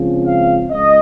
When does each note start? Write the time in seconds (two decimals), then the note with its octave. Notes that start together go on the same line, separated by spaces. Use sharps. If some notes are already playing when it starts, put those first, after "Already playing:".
Already playing: C#2 C#3 F3 C4
0.24 F5
0.71 C#2 D#5